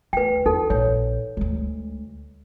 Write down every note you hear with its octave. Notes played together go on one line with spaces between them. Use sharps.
D2 B4 G5
E2 D#4 A4
A#1 C#5
D2 G#3